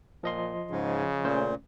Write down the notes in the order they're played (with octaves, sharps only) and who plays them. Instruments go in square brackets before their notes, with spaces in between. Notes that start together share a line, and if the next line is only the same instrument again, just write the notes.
[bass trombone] A#2 [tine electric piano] F3 D#5 C6
[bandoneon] G#2 [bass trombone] C#3
[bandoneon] A#2 [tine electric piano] A3 C#4 C5